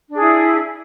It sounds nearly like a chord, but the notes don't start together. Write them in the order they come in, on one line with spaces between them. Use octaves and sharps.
D4 G#4 E4